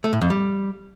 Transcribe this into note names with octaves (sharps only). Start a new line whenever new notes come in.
A3
A2
F2
G3